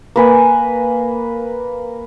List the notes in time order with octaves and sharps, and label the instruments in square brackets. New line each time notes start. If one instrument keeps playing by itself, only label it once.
[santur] A#3 B4 G#5